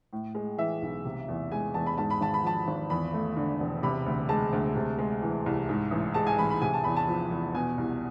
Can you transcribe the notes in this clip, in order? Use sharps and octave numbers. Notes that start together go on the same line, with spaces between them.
A2
G#3
E3 E5
B1
C3
E2
G#3 G#5
E2 A5
B5
G#2 A5
B5
G#1 A5
B5
F3 A5
G#1
E2 B5
A3
D3
E1
C3 B5
D2
G#3 A5
D2
C3
G#3
E3
C2
G#2
A1
G#3 A5
G#5
A1 B5
B5
C3 G#5
A5
E2 B5
A5
F3
E2
B2 G#5
C2